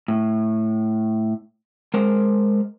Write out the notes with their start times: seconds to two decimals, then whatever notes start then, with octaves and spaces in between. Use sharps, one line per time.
0.08 A2
1.94 G#3 A#4 C5